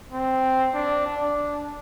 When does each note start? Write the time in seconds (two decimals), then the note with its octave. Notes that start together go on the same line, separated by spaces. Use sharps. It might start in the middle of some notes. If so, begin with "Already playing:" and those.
0.12 C4
0.74 D4
1.07 D4